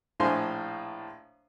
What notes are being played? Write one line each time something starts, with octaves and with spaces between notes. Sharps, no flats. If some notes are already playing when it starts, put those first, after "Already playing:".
A#1 A2 C5 F5 G#5 C6